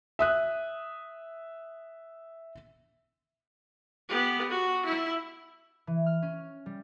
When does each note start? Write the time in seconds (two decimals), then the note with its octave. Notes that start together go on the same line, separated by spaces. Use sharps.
0.19 E5 D#6 F#6
4.09 B3 G4
4.50 F#4
4.85 E4
5.87 E3
6.06 F6
6.22 C#4
6.66 G3